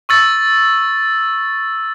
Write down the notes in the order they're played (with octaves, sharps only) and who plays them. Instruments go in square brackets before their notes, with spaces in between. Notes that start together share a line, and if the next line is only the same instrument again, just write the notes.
[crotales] C#6 E6 A6